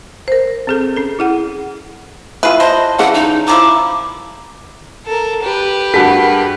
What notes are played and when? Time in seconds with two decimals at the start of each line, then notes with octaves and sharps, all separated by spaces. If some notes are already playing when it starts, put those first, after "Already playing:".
0.28 A#4 C5
0.67 C4 G#4 A4
0.97 C#4 A4
1.19 E4 G#4 F#5
2.43 E4 F4 G#4 B4
2.60 C5 D#5 A5
2.99 C#3 E3 G3 F#5
3.14 D#4
3.48 D#3 F3 E4 A#5 D6
5.06 A4 A#4
5.43 G4 B4
5.94 G2 F#4 G#4 A#4 F#5 A5 B6